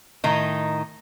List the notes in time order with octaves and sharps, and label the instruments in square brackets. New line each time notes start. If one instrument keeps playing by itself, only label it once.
[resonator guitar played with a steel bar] A2 D#3 D#4